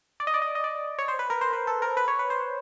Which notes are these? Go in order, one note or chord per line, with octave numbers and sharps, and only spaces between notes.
D5
D#5
D5
D#5
D#5
D5
C#5
C5
B4
A#4
C5
B4
A4
A#4
B4
C#5
B4
C5